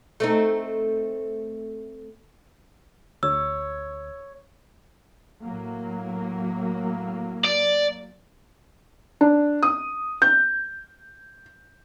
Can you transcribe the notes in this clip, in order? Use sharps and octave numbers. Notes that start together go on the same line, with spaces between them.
A3 C4 D#4
D2 C#5 E6
A2 F#3 A#3
D5
D4
D#6
G6